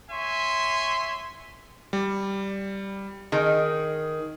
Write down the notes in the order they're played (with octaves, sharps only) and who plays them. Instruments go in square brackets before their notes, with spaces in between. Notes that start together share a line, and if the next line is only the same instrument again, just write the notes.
[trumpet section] C#5 E5 G#5 C6
[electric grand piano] G3
[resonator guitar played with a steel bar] D#3 [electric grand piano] G#4